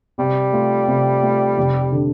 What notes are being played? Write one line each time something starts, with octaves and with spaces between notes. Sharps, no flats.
C3 G3
A3 F4
C3
A3 F4
F1
D3